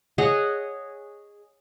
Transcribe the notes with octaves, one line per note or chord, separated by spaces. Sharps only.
G#4 C#5 D#5 F#5